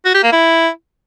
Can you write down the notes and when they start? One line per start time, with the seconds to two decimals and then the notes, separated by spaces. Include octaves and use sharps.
0.05 F#4
0.14 G4
0.23 A#3
0.32 E4